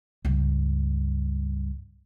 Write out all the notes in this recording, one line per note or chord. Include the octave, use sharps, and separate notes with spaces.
C#2 G2